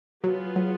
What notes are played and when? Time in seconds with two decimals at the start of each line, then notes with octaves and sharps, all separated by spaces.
0.24 F#3 B3 F4 G#4
0.56 F#3